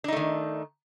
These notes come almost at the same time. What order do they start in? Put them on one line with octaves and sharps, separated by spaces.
D4 D#4 A3 D#3